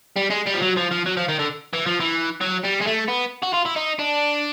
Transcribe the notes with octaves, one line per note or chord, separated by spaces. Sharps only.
G3
G#3
G3
F3
F#3
F3
F3
F#3
F3
D#3
D3
E3
F3
E3
F#3
G3
G#3
A3
B3
F#4
F4
E4
D#4
D4